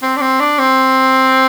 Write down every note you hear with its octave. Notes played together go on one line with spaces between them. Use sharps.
C4
D4
C4
D4
C4